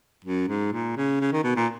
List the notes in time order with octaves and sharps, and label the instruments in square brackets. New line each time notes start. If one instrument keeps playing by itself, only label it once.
[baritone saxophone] F#2
G#2
A#2
C#3
C#3
D#3
B2
A#2